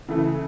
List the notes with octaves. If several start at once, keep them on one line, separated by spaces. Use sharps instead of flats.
C#3 E3 A3